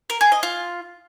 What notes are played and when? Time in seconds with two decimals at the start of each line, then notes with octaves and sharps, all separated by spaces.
0.10 A#4
0.21 G#4
0.32 D#5
0.43 F4